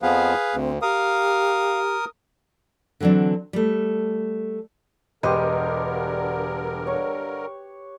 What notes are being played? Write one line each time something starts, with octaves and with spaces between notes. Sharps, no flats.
F2 F3 B3 G#4 B4 F5
D2 C4
G4 A#4 F5 D#6
D3 E3 F#3 C4 D4
G3 A3
E1 G2 D3 G4 A#4 B4 D#5 C6
C#5